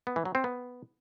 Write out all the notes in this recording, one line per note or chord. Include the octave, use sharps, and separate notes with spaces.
B3
E3
F#3
C4
B3